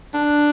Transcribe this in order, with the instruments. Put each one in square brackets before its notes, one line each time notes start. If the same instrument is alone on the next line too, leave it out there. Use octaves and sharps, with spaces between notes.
[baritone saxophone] D4